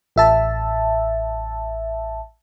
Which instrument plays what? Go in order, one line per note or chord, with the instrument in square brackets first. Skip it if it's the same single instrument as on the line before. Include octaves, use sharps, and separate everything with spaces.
[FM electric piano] A1 E5 A5